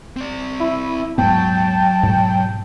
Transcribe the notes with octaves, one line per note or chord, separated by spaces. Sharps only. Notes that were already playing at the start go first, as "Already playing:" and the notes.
C4 D5
E4
D#1 G#2 F#3 B3 G5 A5
G#2 B2